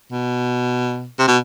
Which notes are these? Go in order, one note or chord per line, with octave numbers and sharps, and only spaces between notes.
B2
C3
B2